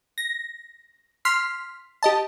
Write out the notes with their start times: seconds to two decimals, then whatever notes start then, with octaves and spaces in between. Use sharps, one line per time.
0.18 A#6
1.25 C6 F6 B6 C7
2.03 G4 D#5 A5